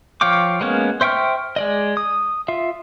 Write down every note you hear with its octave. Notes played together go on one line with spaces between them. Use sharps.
F3 C#5 F5 G5 D6
G#3 A#3 B3 C#4
C5 E5 G5 C#6 F6
G#3 D5 D#5
D#6
F4 E5